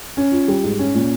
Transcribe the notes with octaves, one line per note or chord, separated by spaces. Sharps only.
C#4
F4
G3
G#2
C#4
A#2